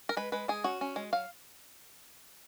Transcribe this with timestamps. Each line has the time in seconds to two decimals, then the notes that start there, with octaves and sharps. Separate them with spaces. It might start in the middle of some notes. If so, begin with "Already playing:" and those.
0.09 A#4
0.17 G#3 B4
0.32 G#3 B4
0.48 G#3 G#4
0.64 C#4 F#4
0.81 C#4
0.96 G#3
1.13 F#3 F5